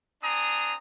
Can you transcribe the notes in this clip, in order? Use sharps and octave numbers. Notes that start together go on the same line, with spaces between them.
C4 D4 G#5 A#5 D#6